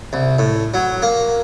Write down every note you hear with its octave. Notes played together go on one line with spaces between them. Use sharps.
C2
A2
F#3
A#3